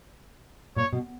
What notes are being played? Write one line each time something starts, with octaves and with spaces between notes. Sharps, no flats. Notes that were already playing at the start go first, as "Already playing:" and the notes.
A#2 C#5
B2